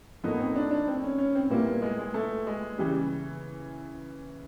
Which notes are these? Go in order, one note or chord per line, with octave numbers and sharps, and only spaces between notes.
A2 F3 A#3 B3 D#4
C4
D4
D4
C4
C#4
C#4
C4
A#2 G3 A#3 B3 E4
G#3
G#3
A3
G#3
C#3 E3 G3